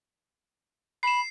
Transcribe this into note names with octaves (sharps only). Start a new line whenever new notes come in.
B5 C7 E7